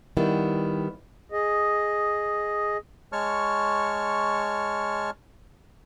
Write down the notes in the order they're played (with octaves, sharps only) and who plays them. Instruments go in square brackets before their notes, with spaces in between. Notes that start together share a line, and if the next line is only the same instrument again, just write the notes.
[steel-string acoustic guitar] D#3 G3 B3 E4
[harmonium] G#4 D#5
[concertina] G#3 C#5 A5 C#6 F6